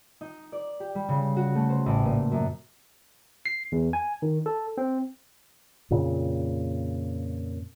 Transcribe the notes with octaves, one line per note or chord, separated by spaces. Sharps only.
D#4
D5
G4
G3
C#3
F#4
A3
C5
A1
A#2
F#2
C7
E2
G#5
D#3
A4
C4
F2 A#2 C#3